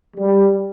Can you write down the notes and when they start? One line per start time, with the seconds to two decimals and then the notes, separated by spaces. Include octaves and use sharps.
0.17 G3